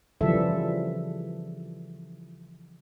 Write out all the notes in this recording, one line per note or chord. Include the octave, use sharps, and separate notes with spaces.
C#3 E3 F3 G3 A4 E5